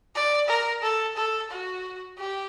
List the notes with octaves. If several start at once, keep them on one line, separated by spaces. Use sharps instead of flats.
D5
A#4
A4
A4
F#4
G4